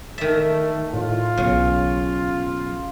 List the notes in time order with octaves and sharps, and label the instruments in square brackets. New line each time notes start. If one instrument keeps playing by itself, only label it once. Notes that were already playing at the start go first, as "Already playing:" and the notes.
[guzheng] D#3 E5 [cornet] A3 [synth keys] A5
[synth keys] A2 [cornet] F4
[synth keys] B1 [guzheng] C#3